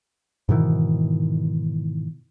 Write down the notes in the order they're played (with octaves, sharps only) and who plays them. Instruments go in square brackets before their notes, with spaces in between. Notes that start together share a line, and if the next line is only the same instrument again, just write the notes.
[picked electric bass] G#2 B2 D#3 E3